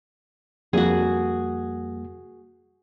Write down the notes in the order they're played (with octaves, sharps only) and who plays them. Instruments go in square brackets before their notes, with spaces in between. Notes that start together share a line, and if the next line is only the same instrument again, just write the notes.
[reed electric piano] F2 G3 A#3 [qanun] F#4 G#4